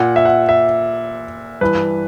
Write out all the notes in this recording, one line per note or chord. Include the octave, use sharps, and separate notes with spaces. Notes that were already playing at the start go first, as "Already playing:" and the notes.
Already playing: A#2 F#5
E5
F#5
E5
G2 E3 B4